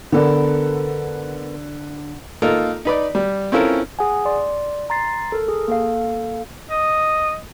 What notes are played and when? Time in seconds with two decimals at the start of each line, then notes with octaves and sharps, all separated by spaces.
0.12 D3 B3 A4 A#4 D5
2.42 A#3 D#4 F4 A4 A#4
2.85 D#4 B4 D5
3.15 G3
3.52 C4 C#4 E4 F4 A4 A#4
3.99 G#4 F#5 G#5
4.25 D5 C6
4.90 A#5 C6 A6 C7
5.32 A4 A#4
5.48 G#4
5.68 A#3 A4 F5
6.70 D#5